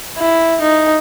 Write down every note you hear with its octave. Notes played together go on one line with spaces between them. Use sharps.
E4
D#4